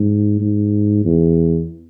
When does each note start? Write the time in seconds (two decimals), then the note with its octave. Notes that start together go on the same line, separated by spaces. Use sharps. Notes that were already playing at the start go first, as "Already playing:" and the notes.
Already playing: G#2
0.41 G#2
1.05 E2